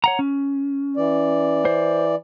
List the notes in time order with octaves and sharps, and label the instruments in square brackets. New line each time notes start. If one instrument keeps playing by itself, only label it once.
[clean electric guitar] C#5 F#5 A#5
C#4
[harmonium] E3 D5
[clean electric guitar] C5